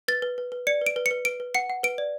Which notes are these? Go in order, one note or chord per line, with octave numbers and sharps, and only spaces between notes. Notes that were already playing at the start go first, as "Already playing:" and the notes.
B4 A6
B4
B4
B4
D5 C#7
B4
D7
B4
C#7
B4
B4 D7
B4
F#5 C#7
F#5
B4 D7
D5